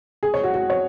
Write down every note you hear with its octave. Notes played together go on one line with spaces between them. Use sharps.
G#4
C#5
F#4
F#4
C#5